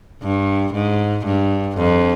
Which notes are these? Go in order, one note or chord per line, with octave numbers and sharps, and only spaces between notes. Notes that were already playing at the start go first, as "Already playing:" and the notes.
G2
G#2
G2
F2